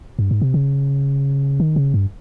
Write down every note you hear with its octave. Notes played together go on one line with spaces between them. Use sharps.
G2
G#2
C3
C#3
D#3
C#3
G2